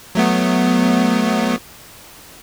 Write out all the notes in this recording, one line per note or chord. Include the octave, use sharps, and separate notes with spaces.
F#3 A3 B3